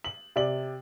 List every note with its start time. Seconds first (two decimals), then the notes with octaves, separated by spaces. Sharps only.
0.04 F#7
0.36 C3 D5 F#7